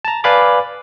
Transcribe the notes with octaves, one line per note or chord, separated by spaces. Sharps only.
A5 A#5
B4 D5 F5 G#5 B5 D6